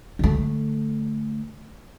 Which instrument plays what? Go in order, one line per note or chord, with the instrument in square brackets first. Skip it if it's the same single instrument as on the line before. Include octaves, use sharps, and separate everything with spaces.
[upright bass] D3 A3